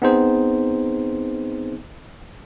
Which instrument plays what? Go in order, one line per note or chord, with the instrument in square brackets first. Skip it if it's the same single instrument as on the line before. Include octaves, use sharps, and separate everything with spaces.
[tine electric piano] B3 C4 D#4 G#4 C5